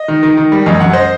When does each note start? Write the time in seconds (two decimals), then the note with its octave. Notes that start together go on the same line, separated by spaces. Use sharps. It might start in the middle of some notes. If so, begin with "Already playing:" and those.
Already playing: D#5
0.08 D#3
0.23 D#3
0.37 D#3
0.52 G3
0.66 F#2 D#5
0.80 F#2 F#5
0.93 C5 D#5